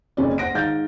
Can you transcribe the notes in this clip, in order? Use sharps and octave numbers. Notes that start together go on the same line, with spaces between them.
F#1 C#4 D5
C5 F#5 A#6 D7
G#2 D#3 F5 G6 A6